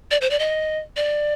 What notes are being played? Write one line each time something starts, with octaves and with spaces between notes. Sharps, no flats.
D5
C5
D5
D#5
D5